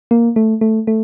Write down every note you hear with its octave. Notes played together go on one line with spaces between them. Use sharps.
A#3
A3
A3
A3